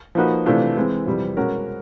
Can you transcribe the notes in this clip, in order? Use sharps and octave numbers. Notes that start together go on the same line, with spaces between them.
F3 A#3 D#4 F#4 B4
C3 E3 A3 D4 F4
E3 G#3 C4
F2 C3 E3 G3
B2 G#3 C#4 F#4 A#4